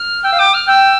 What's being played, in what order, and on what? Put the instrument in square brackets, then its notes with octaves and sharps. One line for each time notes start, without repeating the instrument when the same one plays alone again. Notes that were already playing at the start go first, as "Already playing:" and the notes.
Already playing: [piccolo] F6
[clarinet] G5 [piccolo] E6
[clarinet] F5
[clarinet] G5 [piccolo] D6
[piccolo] F6
[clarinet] G5 [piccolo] E6